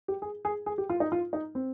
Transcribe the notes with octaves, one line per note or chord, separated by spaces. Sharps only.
G4
G#4
G#4
G#4
G4
F4
D#4
F4
D#4
C4